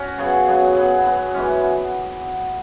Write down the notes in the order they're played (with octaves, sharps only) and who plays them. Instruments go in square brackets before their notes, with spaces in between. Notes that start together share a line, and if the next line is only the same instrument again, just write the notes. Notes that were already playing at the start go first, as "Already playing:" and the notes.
Already playing: [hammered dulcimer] C#4 F#4
C#3 F#3 B3 G#4
C#3 F#3 B3 G#4
F#3 B3 G#4
F#3 B3 G#4
F#2 E3 G#3 C#4